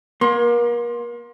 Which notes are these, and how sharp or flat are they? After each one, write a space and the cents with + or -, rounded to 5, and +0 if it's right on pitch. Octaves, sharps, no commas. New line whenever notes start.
A#3 +35 C6 +20